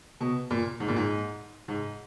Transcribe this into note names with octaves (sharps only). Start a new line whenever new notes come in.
B2
A#2
G#2
A#2
G#2
G#2